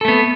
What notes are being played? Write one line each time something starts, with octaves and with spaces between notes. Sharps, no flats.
A3 B3 A4